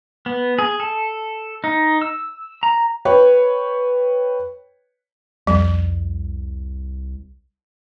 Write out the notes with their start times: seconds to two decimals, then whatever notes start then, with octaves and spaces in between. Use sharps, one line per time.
0.26 B3
0.59 G#4
0.80 A4
1.64 D#4
2.01 E6
2.63 A#5
3.05 B4 C#5 G5 C#6
5.47 C2 F2 G3